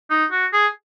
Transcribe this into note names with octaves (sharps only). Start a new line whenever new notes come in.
D#4
F#4
G#4